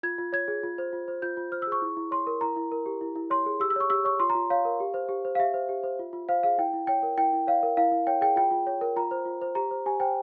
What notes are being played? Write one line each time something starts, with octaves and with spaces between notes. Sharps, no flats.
F4 G#6
F4
C#5 G#6
G#4
F4
C5
F4
C5
F4 G6
F4
C5 F6
E6
G#4 C#6
E4
E4
C#5 C6
A#4
E4 A#5
E4
A#4
G4
E4
E4
C#5 C6
G#4
G4 E6
E6
C#5 C#6
G4 E6
C#5 C#6
F4 C6
A#5
F4
C#5 F5
A#4
G4
C5
G4
C5
F5
G4 E5
C5
G4
C5
F4
F4
C5 F5
G#4 F5
E4 G5
E4
C#5 G5
A#4
E4 G5
E4
C#5 F5
A#4
E4 F5
E4
C#5 G5
G#4 G5
F4 G5
F4
C#5
A#4
F4 A#5
C5
F4
C5
G4 A#5
C5
G4 G#5
C5 G5